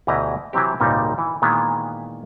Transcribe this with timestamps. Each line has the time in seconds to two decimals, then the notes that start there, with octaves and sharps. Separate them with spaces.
0.07 D2 B2 E3 G4 D#5 A#5
0.53 C3 E3 F#3 C4 G4
0.80 G#1 C#2 A#2 G3 D#4
1.18 E3
1.42 A#2 D#3 E3 G#3 B3